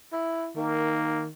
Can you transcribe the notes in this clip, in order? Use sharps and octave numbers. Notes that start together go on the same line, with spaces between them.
E4
D#3 A#3